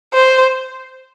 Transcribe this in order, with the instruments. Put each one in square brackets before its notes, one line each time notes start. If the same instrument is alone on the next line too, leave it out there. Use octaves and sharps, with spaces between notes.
[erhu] C5